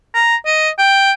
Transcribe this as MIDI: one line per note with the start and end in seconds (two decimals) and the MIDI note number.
0.14 0.36 82
0.46 0.70 75
0.78 1.12 79